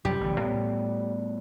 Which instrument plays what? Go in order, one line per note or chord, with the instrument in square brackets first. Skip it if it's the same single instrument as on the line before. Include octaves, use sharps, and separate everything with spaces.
[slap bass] F#2 C3 F3 [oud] G3
[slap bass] A1 D2 D3
A2 B3